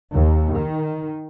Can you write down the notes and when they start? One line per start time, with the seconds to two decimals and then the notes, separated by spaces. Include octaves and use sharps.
0.13 D#2
0.57 D#3